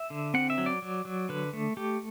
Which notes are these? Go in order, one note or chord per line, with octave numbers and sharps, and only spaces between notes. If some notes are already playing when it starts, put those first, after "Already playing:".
Already playing: E5
D3
C4 F#5
E5
F#3
D5
F#3
F#3
D3 B4
A3
A3 G4